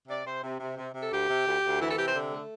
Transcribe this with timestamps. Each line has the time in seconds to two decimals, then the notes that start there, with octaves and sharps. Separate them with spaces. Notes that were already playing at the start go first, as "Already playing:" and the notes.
0.07 C3 D5
0.24 C3 C5
0.42 C3
0.59 C3
0.76 C3
0.93 C3
0.99 A4
1.10 D2 G4
1.28 C3
1.46 D2
1.62 D2
1.79 E3 E4
1.88 A4
1.97 C3 G4
2.05 C5
2.14 D3
2.31 A3